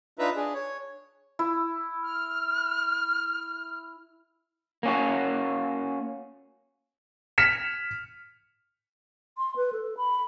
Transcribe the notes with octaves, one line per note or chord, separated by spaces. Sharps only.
D4 D#4 F4 B4 E5 A#5
D4 G#4
C#5
E4
F6
A#3 C#4 F#4
F6 B6 C#7 E7
C6
B4
A4
B5